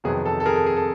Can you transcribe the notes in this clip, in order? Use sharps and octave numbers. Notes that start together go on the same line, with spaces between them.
F2 C3 D#3 F#3 B3 G#4
A4
A4
G#4 A#4
A4
G#4
A4